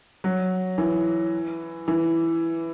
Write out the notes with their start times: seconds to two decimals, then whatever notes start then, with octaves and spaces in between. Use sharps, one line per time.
0.24 F#3
0.78 E3
1.88 E3